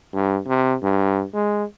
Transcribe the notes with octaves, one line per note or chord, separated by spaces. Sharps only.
G2
C3
G2
G#3